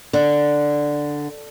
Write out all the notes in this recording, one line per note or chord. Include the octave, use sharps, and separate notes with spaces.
D3